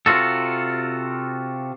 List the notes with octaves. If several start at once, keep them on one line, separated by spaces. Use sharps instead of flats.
C3 F4 F#4 A4